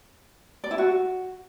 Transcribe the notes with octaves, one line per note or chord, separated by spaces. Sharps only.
D5
E4
F#4